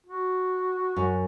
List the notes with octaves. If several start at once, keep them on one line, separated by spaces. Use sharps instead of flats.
F#4
F#2